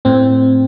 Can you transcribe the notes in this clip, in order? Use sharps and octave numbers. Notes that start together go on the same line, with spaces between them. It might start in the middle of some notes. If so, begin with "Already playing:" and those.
A2 C4